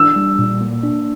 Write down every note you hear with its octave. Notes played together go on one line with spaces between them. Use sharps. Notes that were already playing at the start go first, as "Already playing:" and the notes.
Already playing: D4 E6
G3
A#2
A#3
D4